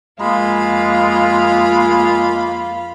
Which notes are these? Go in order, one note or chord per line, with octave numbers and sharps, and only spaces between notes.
F2 G#3 A#3 F4 B5